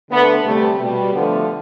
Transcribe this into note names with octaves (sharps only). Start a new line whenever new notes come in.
D3 A3 B3
C3 G3 A3
B2 G3
D3 F3 A3 B3